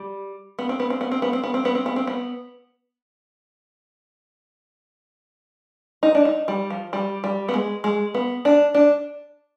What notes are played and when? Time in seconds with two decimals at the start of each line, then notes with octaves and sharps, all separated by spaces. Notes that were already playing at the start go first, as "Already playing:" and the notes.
Already playing: G3
0.59 B3
0.69 C4
0.80 B3
0.90 C4
1.01 B3
1.12 C4
1.22 B3
1.33 C4
1.43 B3
1.54 C4
1.65 B3
1.75 C4
1.86 B3
1.96 C4
2.07 B3
6.03 D#4
6.15 D4
6.25 D#4
6.48 G3
6.70 F3
6.93 G3
7.24 G3
7.49 B3
7.54 G#3
7.84 G#3
8.14 B3
8.45 D4
8.75 D4